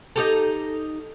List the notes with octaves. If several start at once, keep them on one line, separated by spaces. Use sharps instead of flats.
D#4 G4 A4